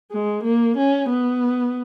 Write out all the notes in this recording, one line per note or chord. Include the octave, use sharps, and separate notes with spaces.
G#3
A#3
C#4
B3